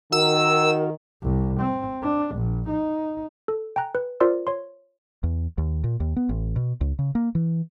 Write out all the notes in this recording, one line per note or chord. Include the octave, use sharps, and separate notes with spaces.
D#3 F#4 A#4 E6
C2
C4
D4
A#1
D#4
A4
G5 G#5 A#5 F#6
B4
F4 A#4 C5 D5 C6 E6
C#5 C6
E2
D#2
A#2
D#2
B3
A1
B2
C#2
C#3
A#3
E3